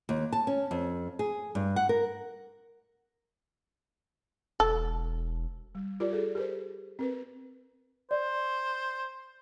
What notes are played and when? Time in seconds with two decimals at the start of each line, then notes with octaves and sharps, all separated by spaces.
0.09 D#2
0.32 A5
0.47 C#4
0.71 F2
1.19 G#4
1.55 G2
1.76 F#5
1.89 A#4
4.60 E1 A4
5.75 G3
6.00 F4 G4 A#4 D5
6.13 G#4 A4
6.35 G4 A#4 C5
6.99 C4 A#4 B4
8.11 C5 D5